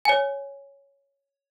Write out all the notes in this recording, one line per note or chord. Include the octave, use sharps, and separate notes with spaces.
C#5 G#5